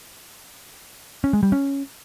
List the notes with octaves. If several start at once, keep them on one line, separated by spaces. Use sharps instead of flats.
C#4
G#3
G3
C#4